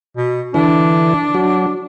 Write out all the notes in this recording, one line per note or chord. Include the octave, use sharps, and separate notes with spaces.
B2
D3 E3 D4 E4
F#3 F#4